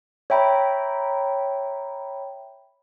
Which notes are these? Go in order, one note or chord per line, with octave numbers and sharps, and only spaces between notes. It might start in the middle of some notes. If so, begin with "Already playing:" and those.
C#5 E5 G5 A#5 B5